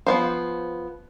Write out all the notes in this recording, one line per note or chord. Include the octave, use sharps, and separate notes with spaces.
F3 B3 C5